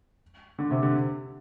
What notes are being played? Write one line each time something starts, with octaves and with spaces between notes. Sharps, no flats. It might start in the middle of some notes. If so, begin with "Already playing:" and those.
D3
C3
D3